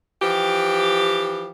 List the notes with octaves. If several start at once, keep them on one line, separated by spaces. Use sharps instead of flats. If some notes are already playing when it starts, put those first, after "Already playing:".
E3 F3 G4